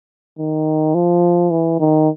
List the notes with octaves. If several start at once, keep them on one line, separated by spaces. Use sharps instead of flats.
D#3
F3
E3
D#3